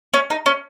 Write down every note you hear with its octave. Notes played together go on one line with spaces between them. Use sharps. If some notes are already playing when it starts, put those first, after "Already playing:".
C#4
D#4
C#4